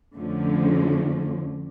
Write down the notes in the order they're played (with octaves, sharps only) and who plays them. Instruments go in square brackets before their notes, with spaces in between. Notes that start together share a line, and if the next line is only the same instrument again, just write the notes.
[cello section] F2 D3 F3 A3 C#4